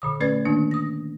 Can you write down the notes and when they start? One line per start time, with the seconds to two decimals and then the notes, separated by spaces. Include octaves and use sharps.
0.02 A#2 D3 D#6
0.20 A3 C#4 B4 D5 G#6
0.45 D#3 A#3 D4
0.71 D#6 A#6